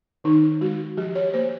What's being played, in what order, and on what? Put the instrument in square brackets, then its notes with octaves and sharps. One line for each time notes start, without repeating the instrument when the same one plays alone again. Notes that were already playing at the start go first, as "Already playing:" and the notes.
[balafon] D#3 D#4
G#3 F#4
F3 G4
C#5
A#3 C5